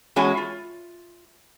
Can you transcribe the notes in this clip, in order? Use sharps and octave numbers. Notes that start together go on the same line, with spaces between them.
E2 G#3 C#4 F#4 G#5
F4